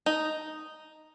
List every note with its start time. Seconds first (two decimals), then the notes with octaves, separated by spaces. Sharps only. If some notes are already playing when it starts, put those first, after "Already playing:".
0.06 D#4